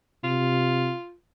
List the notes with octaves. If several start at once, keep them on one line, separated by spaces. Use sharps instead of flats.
C3 F4